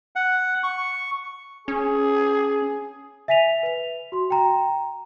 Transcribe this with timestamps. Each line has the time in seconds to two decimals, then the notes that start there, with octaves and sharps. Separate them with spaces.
0.16 F#5
0.64 C#6
1.68 C#4 G#4
3.28 E5 G#5 B6 D#7 F7
3.63 B4 F7
4.12 F#4 C6
4.30 G5 A#5